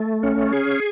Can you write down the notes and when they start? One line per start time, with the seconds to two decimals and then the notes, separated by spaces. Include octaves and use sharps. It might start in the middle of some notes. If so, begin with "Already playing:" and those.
Already playing: A3
0.23 C#4
0.53 G#4